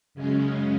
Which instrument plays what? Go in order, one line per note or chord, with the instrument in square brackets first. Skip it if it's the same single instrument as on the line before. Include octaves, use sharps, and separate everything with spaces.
[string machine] F#2 C#3 G#3 C#4